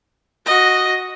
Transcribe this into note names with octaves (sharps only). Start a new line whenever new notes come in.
F#4 D#5